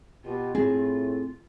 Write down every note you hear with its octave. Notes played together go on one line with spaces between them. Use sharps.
B2 F4 G4
A2 C4 G#4